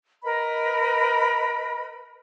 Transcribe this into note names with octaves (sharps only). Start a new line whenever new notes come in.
A#4 B4 D#5 B5